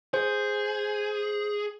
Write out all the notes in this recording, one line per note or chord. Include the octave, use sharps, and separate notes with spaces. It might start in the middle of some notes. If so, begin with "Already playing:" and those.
G#4 C5